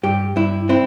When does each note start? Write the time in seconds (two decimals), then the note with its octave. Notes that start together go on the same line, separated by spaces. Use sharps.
0.03 G2 G4
0.36 G2 E4
0.69 C4 E4